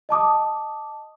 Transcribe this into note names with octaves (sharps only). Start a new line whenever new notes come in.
D#5 A5 D6 D#6